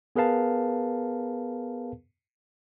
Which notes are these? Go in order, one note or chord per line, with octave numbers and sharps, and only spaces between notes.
B3 G#4 A#4 B4 F5 A5